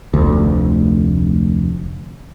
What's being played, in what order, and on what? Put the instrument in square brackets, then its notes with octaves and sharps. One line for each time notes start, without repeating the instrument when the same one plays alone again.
[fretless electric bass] F1 D2